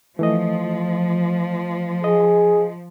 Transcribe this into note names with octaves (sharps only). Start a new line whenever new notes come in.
E3 F3 A3 D#5
G#4 D#5